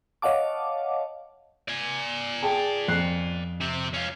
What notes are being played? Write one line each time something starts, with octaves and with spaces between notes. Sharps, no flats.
C#5 D#5 F5 F#5 A5 D6
D5 G#5
G#4 G5 A5
F2 F#6 C7
C3 C4
C#4 F4